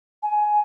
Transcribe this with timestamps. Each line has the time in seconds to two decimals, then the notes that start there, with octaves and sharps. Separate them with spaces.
0.23 G#5